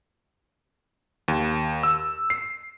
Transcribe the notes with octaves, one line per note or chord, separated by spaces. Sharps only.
D#2
E6
C7